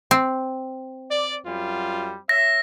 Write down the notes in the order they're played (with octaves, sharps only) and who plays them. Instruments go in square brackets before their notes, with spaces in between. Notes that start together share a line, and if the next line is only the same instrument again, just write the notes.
[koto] C4
[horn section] D5
F#2 G3 F4
[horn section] C#5 E5 [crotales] A#6